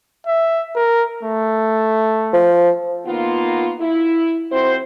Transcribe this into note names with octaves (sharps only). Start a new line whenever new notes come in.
E5
A#4
A3
F3
D#3 A#3 B3 F4
E4
F2 C4 E4 F#4 C5